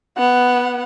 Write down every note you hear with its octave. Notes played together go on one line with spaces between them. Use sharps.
B3 F#5